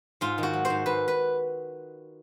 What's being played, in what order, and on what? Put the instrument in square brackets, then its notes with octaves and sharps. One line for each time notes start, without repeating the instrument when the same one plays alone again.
[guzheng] G#2 F4
D#3
F#4
F#3
C5
G#2
G#2 B4
B4